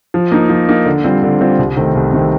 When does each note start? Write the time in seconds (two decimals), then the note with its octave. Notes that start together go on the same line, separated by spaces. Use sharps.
0.14 F3
0.32 A#3 D#4
0.49 F3
0.69 A#3 D#4
0.86 D3
1.04 G3 C4 F4 C5
1.23 D3
1.41 G3 C4 F4 C5
1.59 C2
1.77 C3 D#3 A3 C4
1.95 C2
2.13 C3 D#3 A3 C4